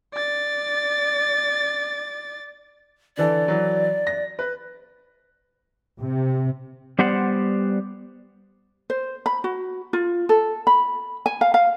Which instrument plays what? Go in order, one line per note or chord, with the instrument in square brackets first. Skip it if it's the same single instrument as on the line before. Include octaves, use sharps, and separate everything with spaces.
[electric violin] D5 A6
[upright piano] D3 E3 A4 [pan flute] D5
[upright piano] E3 F#3
A#6
B4
[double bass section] C3
[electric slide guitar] G3 B3 G4 C5 D5 F#5
[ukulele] C5
B5
F#4
F4
A4
B5
G#5
F5
F5